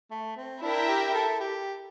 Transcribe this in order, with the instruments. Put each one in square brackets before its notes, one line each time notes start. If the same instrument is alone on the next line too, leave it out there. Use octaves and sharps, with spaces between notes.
[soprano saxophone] A3
C4
[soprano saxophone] D4 [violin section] E4 A#4 E5 G5
[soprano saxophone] G4
A4
G4